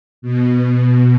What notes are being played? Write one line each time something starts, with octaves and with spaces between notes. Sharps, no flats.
B2